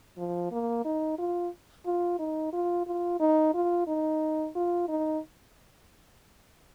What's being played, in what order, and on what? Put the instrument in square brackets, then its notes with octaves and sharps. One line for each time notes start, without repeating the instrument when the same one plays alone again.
[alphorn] F3
A#3
D#4
F4
F4
D#4
F4
F4
D#4
F4
D#4
F4
D#4